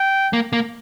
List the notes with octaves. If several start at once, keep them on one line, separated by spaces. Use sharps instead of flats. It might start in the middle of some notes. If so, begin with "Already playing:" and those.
Already playing: G5
A#3
A#3